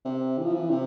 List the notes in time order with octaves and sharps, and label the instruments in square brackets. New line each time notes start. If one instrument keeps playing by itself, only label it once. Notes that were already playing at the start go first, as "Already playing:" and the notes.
[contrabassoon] C3
E3
F3
E3
C3